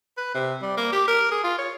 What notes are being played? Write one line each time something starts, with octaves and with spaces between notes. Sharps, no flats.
B4
C3
G3
A#3
G4
A#4
G#4
F4
C#5